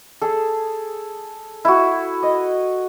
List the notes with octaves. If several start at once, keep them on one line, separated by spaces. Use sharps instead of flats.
G#4 A4
E4 F#4
D#5